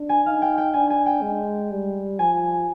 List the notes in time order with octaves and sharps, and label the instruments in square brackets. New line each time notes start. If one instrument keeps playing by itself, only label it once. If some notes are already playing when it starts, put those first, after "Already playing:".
Already playing: [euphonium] D4
[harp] G#5
[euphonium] D#4 [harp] F5
[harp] G5
G5
[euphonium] D4 [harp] G#5
[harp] G#5
G5
[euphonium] G#3
G3
[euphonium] F3 [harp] G#5